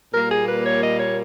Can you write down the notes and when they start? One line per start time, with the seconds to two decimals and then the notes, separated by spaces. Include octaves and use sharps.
0.12 A#2 G3 A#3 A#4
0.29 G#4
0.46 B4
0.64 C#5
0.82 D#5
0.98 C#5